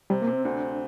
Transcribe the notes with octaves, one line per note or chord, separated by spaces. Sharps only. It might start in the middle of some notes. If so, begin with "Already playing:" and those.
C3 G3
A#3
C3
C4
D2 D4